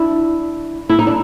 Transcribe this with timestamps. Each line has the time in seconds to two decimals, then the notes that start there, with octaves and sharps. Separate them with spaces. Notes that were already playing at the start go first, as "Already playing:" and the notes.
Already playing: D4 E4
0.89 E4
0.99 D#4
1.07 D4